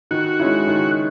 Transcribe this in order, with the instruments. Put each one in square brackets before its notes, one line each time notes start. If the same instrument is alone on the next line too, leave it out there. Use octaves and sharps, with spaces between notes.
[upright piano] D#3 [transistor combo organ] F#4
[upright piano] G#3 C#4 E4
D#3